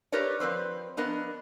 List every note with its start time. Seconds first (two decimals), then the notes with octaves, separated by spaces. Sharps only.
0.12 G4 A#4 B4 C#5 D5
0.40 F3 C4 B4 C5
0.97 F2 B3 D4 A#4 D#5